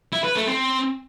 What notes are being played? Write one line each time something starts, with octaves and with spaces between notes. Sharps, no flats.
E4
B4
A3
C4